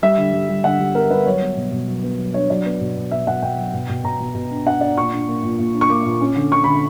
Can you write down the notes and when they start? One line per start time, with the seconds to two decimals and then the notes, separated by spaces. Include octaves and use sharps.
0.02 G3 E5
0.18 D3
0.33 G3
0.49 G3
0.64 D3 F#5
0.80 G3
0.95 B3 A#4
1.10 G3 B4
1.26 F#3 C#5
1.41 B3
1.56 B2
1.72 B2
1.88 F#3
2.03 B3
2.18 F#3
2.34 D4 C#5
2.50 F#3 D5
2.66 B3
2.81 B2
2.97 B2
3.11 B2 E5
3.27 B2 F#5
3.42 B2 G5
3.58 F#3
3.73 B2
3.89 B2
4.04 B2 A#5
4.20 B2
4.34 B2
4.51 D4
4.66 D4 F#5
4.81 D4 D5
4.97 A#2 C#6
5.13 D4
5.28 A#3
5.43 A#2
5.59 A#2
5.74 D4
5.81 C#6
5.89 A#3 D6
6.05 A#2
6.21 C#4
6.36 D3
6.52 D3 C#6
6.64 D3 B5